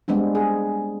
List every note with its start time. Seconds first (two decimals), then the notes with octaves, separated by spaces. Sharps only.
0.08 G3 G#3 B3 C4 D4
0.35 G#4